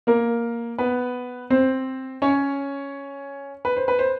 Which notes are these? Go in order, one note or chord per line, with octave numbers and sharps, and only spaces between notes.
A#3 A#4
B3 B4
C4 C5
C#4 C#5
B4
C5
B4
C5